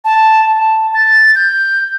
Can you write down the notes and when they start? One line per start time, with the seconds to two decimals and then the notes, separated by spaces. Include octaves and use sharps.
0.04 A5
0.50 A5
0.94 A6
1.35 G6